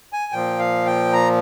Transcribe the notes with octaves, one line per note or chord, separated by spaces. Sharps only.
G#5
A#2 F3 G5
F5
G5
A#5